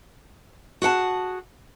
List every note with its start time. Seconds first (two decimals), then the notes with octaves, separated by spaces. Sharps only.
0.82 F#4 G#4 F#5 A5